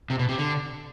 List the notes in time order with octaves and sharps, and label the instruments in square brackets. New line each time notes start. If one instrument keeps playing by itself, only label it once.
[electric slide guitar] C3
B2
C3
D3